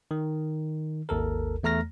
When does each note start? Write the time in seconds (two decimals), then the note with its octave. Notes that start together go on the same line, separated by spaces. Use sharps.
0.11 D#3
1.09 G#1 D#2 A4 A#4
1.63 E2 A3 A#5 F6 A#6